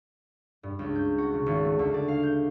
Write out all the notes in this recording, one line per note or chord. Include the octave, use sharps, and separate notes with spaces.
G2
C#2
G6
F#4
C#3
G#1
A3
D2
D5
F5
G6